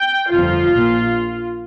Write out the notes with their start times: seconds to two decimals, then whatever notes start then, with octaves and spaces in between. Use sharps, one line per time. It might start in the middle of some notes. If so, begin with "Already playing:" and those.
Already playing: G5
0.31 G1 F2 F3 F4
0.72 A#1 A#2